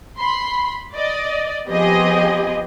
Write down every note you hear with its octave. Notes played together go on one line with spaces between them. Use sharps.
B5 C6
D5 D#5
F3 B3 C4 G4 G#4 D#5